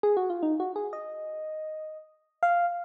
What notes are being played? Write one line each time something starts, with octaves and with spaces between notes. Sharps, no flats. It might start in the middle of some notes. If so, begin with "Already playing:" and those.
G#4
F#4
F4
D#4
F#4
G#4
D#5
F5